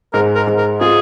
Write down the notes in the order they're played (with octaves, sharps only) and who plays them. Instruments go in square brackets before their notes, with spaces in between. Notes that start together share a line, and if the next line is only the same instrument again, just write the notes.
[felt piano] G#2 [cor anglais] A#4
[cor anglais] A#4
[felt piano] G#2
[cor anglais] A#4
[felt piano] F4 [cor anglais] G#4